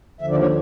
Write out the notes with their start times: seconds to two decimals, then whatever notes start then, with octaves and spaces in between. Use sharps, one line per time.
0.21 D#2 D3 F3 E5
0.31 D5
0.41 C#5